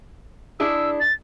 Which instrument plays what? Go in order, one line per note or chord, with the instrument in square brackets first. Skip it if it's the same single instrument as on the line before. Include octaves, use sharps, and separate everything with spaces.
[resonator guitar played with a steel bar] D4 E4 G#4 [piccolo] E6
[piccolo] A6